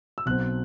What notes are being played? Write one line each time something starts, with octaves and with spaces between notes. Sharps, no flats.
E6
B1 B2 F#3 C4 F#6